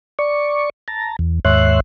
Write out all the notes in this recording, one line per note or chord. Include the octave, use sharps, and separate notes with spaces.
D5 C#6
A5 A#5
E2
D#2 G#2 C#5 E5 C6 F#6